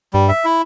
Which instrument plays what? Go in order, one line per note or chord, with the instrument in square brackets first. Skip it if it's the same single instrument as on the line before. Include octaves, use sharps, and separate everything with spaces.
[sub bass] G2 [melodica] G3
[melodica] E5
E4